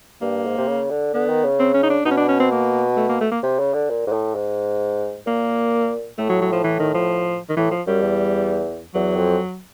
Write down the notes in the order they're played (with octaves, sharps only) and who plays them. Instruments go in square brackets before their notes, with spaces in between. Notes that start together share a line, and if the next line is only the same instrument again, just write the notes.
[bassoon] G2 [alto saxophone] A#3
[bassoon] G#2
C3
C#3
D3
[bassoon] D3 [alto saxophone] B3
[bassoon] D#3
C#3
[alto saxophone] C4
C#4
D#4
D4
[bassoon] B2 [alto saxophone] D#4
[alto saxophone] C#4
D4
C#4
C4
A#3
A3
A#3
A3
A#3
[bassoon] C3
C#3
D3
A#2
G#2
A2
G#2
[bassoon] A#2 [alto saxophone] A#3
[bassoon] A2 [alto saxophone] A3
[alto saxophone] F#3
F#3
F3
E3
D#3
F3
D#3
[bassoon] A2 [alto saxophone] E3
[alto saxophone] F3
[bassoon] F#2 [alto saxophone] G3
[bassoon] E2
[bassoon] E2 [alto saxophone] F#3
[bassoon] F2